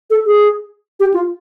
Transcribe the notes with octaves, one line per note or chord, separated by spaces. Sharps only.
A4
G#4
G4
F4